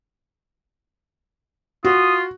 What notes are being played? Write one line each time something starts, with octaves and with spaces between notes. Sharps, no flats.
F4 F#4 D#6